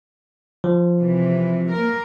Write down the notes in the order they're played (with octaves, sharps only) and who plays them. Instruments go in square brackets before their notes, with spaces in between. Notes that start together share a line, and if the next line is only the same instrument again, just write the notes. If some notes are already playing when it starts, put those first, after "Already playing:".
[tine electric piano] F3
[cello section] C3 E3
A#3 A#4